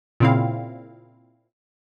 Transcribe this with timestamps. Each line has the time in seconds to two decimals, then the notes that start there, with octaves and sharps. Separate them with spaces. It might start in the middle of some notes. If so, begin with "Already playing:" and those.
0.20 A#2 C#3 C4 E4 F5